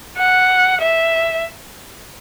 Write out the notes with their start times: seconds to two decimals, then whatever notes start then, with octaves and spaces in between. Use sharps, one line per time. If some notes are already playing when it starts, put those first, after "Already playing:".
0.18 F#5
0.81 E5